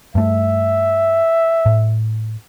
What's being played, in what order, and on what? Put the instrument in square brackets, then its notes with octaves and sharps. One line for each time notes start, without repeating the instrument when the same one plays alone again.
[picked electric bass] G2 A3 [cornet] E5
[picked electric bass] A2